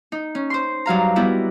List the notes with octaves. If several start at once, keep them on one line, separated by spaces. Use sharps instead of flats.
D#4
C#4
C5 C6
G2 F#3 F5 A#5
G3 B3 E4 F#4 G4